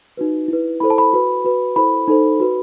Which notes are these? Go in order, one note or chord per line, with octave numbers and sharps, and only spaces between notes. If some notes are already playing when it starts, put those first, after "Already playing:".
D#4 F#4 B4
E4 B4
E4 A4 C5 B5
A5
B5
F#4 B4
F#4 B4
E4 A4 C5 B5
D#4 A4 C5
F#4 B4